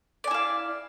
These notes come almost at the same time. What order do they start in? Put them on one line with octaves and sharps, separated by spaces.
D5 G#5 E4 F5